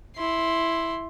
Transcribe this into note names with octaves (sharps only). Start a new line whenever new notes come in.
E4 C6